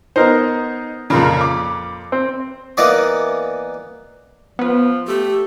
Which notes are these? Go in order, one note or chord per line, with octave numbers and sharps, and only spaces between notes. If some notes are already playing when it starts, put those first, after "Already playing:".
B3 D#4 A#4 C5
F2 A#2 C#3 A#4 B5
D6
C4
E3 A#3 B3 D5 D#5
F3 B3 B4
A3 G4